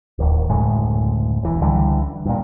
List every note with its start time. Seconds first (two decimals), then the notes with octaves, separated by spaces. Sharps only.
0.19 D1 D#2
0.49 F#1 D2 A2 G#3
1.43 E1 E3
1.61 C#2 D3 E3 G3
2.25 G2 A#2